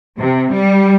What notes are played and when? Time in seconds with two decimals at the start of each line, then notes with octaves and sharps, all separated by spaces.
0.18 C3
0.52 G3